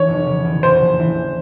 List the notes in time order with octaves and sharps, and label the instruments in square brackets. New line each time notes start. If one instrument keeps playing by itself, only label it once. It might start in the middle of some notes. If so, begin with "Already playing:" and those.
Already playing: [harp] D3 E3 A#3 [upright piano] C#5
[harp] F1
C#3
E2
[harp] A#1 [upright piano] C5
[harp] A#1
E3